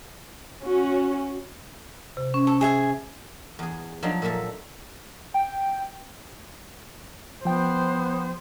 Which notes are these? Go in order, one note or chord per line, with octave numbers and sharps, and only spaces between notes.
C#4 F#4
C3
C#4
A4
G#4 E5 G#5
E2 G#4
F3 F#3 D4 D#4
A#2 A4 A#4 E5 A5
G5
F3 B3 C5 G5